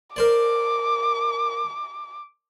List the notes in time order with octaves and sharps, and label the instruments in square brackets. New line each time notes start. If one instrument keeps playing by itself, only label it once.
[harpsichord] A#4 C5 D5 [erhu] D6